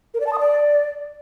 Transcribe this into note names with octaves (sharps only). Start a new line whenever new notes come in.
A#4
D5
A5
D#6
D5